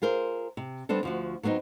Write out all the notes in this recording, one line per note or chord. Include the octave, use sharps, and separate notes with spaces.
F4 G#4 A#4 C5
C3
G3 B3 C4 D4 A4
D2 F3 F#4
F#3 B3 C4 D4 D#4